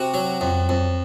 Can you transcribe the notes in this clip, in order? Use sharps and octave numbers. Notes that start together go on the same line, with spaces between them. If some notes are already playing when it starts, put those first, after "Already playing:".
Already playing: C3 F#4
F#3
F2
F2